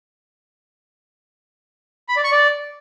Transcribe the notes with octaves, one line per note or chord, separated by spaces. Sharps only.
B5
D5
C#6
D5